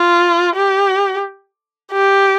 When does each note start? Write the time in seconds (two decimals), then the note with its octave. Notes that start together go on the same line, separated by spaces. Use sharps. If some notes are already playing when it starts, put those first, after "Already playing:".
Already playing: F4
0.57 G4
1.92 G4